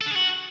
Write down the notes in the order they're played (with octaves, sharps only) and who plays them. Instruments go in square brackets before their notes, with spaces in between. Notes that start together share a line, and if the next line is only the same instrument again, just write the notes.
[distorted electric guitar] A4
D4
G#4
F#4